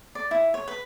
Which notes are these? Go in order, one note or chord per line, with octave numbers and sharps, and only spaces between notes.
D5
E4
C#5
B4